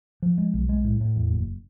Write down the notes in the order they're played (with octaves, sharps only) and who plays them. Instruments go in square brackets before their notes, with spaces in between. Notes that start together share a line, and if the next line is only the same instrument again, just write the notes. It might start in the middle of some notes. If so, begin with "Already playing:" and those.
[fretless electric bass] F3
G#3
B1
G#3
A2
A2
E2
F#1